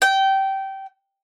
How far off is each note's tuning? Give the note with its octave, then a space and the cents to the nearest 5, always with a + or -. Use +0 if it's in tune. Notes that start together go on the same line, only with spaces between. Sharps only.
G5 -20